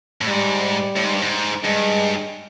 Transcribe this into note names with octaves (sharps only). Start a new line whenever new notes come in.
A2
G#2 G3
A2
G#2
G2
G#2
G2 G#3